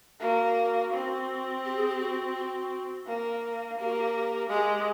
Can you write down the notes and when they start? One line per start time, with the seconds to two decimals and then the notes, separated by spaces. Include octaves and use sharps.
0.20 A#3 F#4
0.93 C4
1.65 G4
1.76 G#4
1.88 G4
2.00 F#4
2.35 F#4
3.07 A#3
3.79 A#3 G4
3.87 F#4
3.94 G4
4.50 G#3 G4